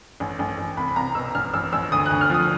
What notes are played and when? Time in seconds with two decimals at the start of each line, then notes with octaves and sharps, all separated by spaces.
0.20 A1
0.39 A1
0.58 A1
0.77 C2 B5
0.88 B5
0.96 C2 A#5
1.15 B2 E6
1.35 A1 F6
1.54 A1 E6
1.73 A1 E6
1.92 D2 D#6
2.06 F#6
2.11 D2
2.21 F6
2.30 F3 D#6